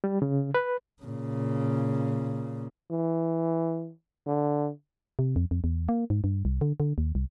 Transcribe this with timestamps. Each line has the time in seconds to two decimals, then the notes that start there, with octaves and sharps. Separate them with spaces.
0.04 G3
0.22 C#3
0.54 B4
1.03 A#2 C#3
2.91 E3
4.27 D3
5.19 C3
5.36 F2
5.51 F2
5.64 E2
5.89 A#3
6.10 G#2
6.24 G2
6.45 C2
6.61 D3
6.80 D3
6.98 D#2
7.15 C2